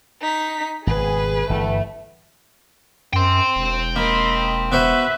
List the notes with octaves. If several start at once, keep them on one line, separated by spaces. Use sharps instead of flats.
D#4 B6
G#1 B2 G#4 B4
G1 G2 E3 A3
F#2 G5 C6
E1
A#3 D#5 B5
B3 F#4 B4 C5 E5